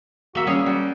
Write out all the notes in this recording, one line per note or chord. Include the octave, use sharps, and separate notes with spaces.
A#3 F#4 E5
G3 C#4 G#4 C#5
G3 F#4